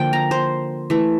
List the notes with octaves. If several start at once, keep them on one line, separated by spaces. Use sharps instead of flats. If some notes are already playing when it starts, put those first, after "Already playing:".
Already playing: D3 F3 A#3 G5
A#5
C5
E3 A3